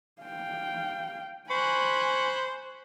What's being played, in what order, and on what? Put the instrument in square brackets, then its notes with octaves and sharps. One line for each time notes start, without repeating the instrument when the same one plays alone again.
[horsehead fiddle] F5 G5
[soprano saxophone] C5 [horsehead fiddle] G#5 [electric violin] B5 F#6 [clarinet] C#6